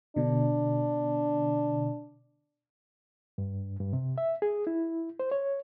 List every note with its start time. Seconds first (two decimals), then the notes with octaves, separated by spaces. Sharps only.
0.16 B2 D3 D4
3.38 G2
3.80 G2
3.93 C3
4.18 E5
4.42 G#4
4.67 E4
5.20 C5
5.32 C#5